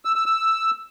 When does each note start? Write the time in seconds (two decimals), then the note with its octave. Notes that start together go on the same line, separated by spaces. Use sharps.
0.05 E6
0.15 E6
0.26 E6